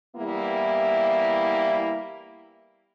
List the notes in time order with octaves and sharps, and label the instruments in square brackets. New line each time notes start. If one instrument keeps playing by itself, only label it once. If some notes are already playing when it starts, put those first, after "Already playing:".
[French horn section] E3 G3 A#3 B3 E4